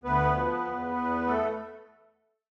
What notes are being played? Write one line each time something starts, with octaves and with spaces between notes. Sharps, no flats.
D2 B3 B4
F3
E2
E2
A3 A4